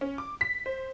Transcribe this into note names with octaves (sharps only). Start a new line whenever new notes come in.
C#4
D6
B6
C5